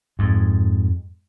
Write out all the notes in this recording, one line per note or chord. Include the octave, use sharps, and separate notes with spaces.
F2 G#2